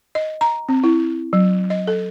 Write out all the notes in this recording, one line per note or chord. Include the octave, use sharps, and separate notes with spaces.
D#5
A#5
C4
E4
F#3
D#5
A4